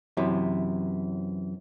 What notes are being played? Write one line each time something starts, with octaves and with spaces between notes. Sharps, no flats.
F#2 C3 E3